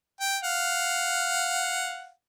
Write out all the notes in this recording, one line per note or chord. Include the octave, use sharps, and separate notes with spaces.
G5
F5 F#5